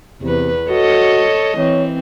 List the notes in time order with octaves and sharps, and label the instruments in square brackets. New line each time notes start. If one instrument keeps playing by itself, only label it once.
[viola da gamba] E2 B4 [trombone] C3
[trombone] F#4 [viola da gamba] A4 C#5 D#5
[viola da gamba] E3 C4 [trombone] C#5